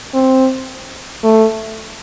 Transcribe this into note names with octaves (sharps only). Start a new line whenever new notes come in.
C4
A3